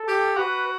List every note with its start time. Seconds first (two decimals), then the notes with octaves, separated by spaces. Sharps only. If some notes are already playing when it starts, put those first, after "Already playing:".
Already playing: A4
0.08 G4
0.37 F#4 B4